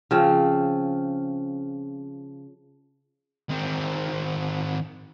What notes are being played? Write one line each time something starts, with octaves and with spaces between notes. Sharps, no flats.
C#3 F3 C4
D#3 C4